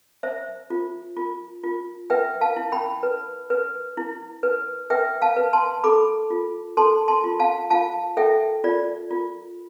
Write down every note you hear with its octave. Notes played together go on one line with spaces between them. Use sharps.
C5 E5
F4
F4
F4
B4 E5 G5
F5 A5
E4
G5 B5
B4
B4
E4
B4
B4 E5 G5
F5 A5
B4
A5 C6
A4 B5 D6
F4
A4 A5 C6
A5 C6
F4
F5 A5
F4 F5 A5
A4 E5 G5
F4 D5
F4